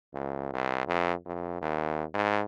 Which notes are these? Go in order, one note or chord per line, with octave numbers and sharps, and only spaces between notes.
C#2
C2
F2
F2
D#2
G#2